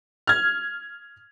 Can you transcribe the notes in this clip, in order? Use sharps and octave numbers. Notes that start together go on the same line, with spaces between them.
F6 G#6